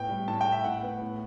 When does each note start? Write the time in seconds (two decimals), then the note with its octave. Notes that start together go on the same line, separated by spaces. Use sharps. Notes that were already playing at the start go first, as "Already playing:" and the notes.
Already playing: A2 B3 G5
0.09 G3
0.28 A2 A5
0.41 G5
0.46 A3
0.52 E5
0.64 A2 F#5
0.83 B3
1.01 A2